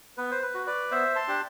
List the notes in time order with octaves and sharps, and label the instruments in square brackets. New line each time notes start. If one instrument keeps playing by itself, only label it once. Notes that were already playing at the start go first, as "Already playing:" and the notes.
[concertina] B3 B4
C5
B4
F#4
B4 D5
B3 C5 E5
A5 C6
D4 G4